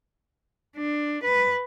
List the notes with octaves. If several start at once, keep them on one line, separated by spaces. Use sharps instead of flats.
D4
B4